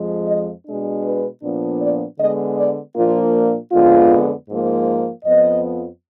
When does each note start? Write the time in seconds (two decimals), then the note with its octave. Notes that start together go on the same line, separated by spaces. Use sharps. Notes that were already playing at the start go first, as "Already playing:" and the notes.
Already playing: F2 F3 G#3
0.27 D#5
0.66 B2 G#3 D4
1.04 B4
1.43 A#2 F3 B3 D4
1.81 D5
2.19 D3 G#3 B3 D#5
2.58 D5
2.96 A#2 F3 A#3 D4 F4
3.72 F2 D3 G#3 B3 F4
4.49 G#2 F3 A#3
5.25 F2 F3 B3 D#5